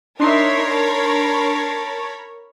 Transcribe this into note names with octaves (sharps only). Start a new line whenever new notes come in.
D4 D#4 A#4 C#5 E5 B5 C6 C7
A5